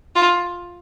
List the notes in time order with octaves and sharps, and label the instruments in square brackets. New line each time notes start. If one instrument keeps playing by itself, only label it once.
[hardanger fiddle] F4